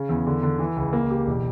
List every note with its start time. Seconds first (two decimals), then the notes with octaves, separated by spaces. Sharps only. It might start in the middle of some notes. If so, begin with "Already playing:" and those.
Already playing: C#3
0.09 E2
0.26 D3
0.43 D3
0.59 E3
0.76 C#2
0.93 A#3
1.10 G4
1.27 E1